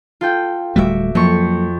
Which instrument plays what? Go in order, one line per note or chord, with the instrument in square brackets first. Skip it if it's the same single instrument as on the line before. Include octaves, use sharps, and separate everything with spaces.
[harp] F4 A4 G5
[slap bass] D1 G3 A3 [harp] F#4 E5 D6
[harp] F2 C#6 [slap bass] F#3 A#3